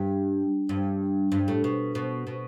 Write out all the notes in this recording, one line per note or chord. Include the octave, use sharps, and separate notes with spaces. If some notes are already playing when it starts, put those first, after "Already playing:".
Already playing: G2
G2
G2
A2
B2
B2
B2